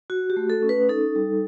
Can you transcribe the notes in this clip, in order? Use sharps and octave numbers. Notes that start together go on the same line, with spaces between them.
F#4
G4
A3
A4
C#4
B4
D#4 A4
G3